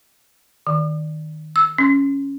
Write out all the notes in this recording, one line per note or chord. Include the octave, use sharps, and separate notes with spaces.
D#3
E6
C#4